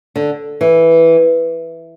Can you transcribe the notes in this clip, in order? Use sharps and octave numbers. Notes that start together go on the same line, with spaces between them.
D3
E3